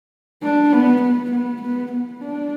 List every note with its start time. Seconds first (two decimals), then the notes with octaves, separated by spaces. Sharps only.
0.42 D4
0.73 B3
1.01 B3
1.31 B3
1.62 B3
1.91 B3
2.21 D4